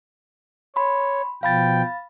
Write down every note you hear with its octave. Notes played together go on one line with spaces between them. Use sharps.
C#5 B5 C6
B2 F3 F5 G5 B5 A6